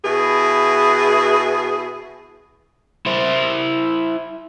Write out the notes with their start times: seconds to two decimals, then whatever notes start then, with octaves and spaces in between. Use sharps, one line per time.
0.04 B2 E4 G#4
3.06 E4 C5